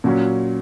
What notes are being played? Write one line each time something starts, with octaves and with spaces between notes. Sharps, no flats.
A#2 F#3 C#4